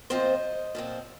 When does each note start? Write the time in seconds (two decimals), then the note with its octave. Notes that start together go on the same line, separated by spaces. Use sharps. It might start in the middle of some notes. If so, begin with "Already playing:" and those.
0.10 A#2 F3 C4 C5 D#5
0.75 A#2 F3 C4